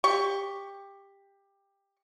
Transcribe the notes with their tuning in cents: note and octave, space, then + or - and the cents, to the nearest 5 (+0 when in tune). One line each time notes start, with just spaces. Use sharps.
G4 +15 C#6 +0